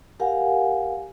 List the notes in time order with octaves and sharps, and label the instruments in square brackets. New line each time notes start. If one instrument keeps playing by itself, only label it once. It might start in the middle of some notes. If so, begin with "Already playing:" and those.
[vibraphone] G4 A#4 F5 F#5 G#5